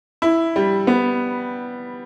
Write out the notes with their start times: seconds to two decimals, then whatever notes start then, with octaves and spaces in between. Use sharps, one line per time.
0.22 E4
0.56 G3
0.87 B3